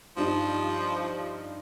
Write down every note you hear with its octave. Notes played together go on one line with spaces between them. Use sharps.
G2 F3 D#4